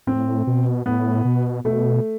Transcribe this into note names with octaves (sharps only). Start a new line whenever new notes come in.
A2 C4
B2
A2 B3
B2
B2 A3